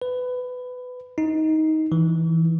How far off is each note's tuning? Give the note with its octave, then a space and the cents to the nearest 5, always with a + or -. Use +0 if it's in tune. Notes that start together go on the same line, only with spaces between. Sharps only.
B4 +20
D#4 +15
E3 -10